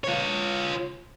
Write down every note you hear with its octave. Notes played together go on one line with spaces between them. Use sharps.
F4 C#5